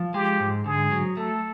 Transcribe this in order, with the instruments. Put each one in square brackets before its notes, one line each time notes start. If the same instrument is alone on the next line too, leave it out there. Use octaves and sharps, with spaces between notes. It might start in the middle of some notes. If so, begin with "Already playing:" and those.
Already playing: [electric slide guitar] F3
[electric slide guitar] G#3 [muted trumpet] G4
[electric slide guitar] G#2
[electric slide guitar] D3 [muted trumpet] G#4
[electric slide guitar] F#3
[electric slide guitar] A3 [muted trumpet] A4